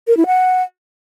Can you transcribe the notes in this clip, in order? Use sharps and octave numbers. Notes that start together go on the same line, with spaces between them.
A#4
E4
F#5